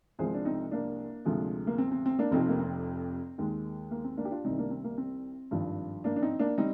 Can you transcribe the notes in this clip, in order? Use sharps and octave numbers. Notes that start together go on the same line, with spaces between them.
C2 C3 F3 G#3 G#4 C5
D4
C4 D#4
A#3 D4
D2 C3 F3 G#3
A#3
C4
C4
C4
A#3 D4
F1 F2 C3 C4 D#4
A#3
C4
D#2 D#3 G#3
A#3
C4
A#3 D4
G4
D4 F4
C2 C3 D#3 G3 C4 D#4
A#3 D4
C4
A#3
C4
G#1 G2 F3
A#3 D4
D4
C4 D#4
A#3 D4
G3 C4 D#4